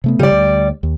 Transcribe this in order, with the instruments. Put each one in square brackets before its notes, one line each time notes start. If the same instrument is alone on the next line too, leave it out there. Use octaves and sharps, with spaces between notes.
[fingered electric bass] C3 A3 B3
[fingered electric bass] C#3 [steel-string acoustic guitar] G3 D5
[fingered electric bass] D2
D#2